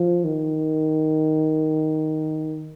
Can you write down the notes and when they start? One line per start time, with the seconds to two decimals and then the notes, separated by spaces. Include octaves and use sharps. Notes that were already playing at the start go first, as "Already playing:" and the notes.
Already playing: F3
0.24 D#3